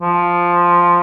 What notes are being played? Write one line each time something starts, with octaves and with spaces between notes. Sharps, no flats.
F3